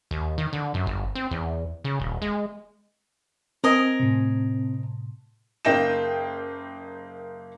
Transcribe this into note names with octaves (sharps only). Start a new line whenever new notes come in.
D#2
D#3
D3
F#2
G1
C4
E2
C#3
D#1
G#3
C4 A#4 D#5 G#5
A2 C3
F#1 A#3 D#4 G5 A#6 E7